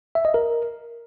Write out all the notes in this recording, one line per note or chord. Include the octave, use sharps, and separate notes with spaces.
E5
D#5
A#4